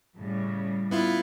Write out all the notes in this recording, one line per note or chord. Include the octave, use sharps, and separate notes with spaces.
A2 C#3 G3
B3 E4 F4